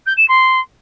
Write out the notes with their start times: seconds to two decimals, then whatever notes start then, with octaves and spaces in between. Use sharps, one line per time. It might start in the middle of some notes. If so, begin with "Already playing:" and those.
0.06 G6
0.17 E7
0.28 C6